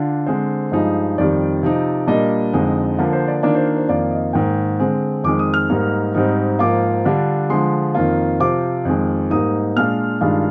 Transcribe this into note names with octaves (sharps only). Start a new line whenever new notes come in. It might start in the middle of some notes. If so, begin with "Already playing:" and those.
Already playing: D3 D4 F4
D3 G#3 C4 C5
G2 F3 G#3 D#4
F2 D#3 G3 D5
C3 F3 C4 D#4
A#2 G3 A#3 D4 D#5
F2 D3 G#3 D#4
D3 F3 A#3 F5
C5
D5
D#3 A#3 D4 F4 D5
C5
C5
F2 D#3 A#3 F4 D5
D#5
G#2 D#3 A#3 G5
D3 G#3 C4
F2 D#3 G#3 D6
D#6
F6
G#2 G3 A#3 D#4
G#2 G3 C4 D#4
G#2 F3 A#3 F4 D6
D3 G3 D4 F4
D3 F3 G#3 C6
F2 D#3 A#3 F4
C3 F3 C4 F4 D6
F2 D#3 G#3
G#2 G3 A#3 D#4 D#6
A#2 G#3 D4 F4 F6
G2 D#3 G#3 D4 F4